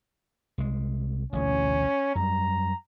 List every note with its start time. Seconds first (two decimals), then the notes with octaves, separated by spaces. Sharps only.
0.58 C2 G#3
1.33 A1 D2 B2 C#4
2.15 F#2 G3 A#5